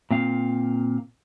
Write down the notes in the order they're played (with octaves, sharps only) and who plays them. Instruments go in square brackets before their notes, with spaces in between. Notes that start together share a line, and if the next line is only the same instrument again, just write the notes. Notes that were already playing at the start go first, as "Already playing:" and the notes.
[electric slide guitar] A#2 C4 F5